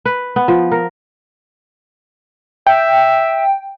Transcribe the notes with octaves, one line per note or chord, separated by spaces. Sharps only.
B4
B3
F3
A#4
E5 G5